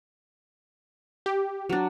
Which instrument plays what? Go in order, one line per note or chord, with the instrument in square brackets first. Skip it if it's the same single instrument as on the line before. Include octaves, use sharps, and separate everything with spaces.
[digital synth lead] G4
[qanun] F#3 D4